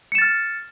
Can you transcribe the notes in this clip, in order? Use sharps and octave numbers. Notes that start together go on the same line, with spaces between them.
F6 A6 C#7 E7